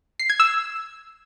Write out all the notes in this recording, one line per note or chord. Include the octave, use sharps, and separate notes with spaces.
C7
G#6
E6